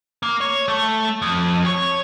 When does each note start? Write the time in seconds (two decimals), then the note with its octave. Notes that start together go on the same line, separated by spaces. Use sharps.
0.23 A#3
0.41 C#5
0.68 A3
1.22 F2
1.66 C#5